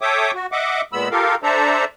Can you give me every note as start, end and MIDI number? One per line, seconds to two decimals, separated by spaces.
0.02 0.31 69
0.02 0.31 73
0.02 0.31 76
0.02 0.31 79
0.02 0.31 86
0.02 0.31 87
0.35 0.46 66
0.52 0.82 75
0.52 0.82 76
0.52 0.82 78
0.52 0.82 86
0.93 1.09 46
0.93 1.09 56
0.93 1.09 59
0.93 1.09 83
0.93 1.09 88
1.11 1.35 65
1.11 1.35 67
1.11 1.35 69
1.11 1.35 70
1.11 1.35 77
1.43 1.85 62
1.43 1.85 69
1.43 1.85 72
1.43 1.85 74
1.43 1.85 76
1.43 1.85 82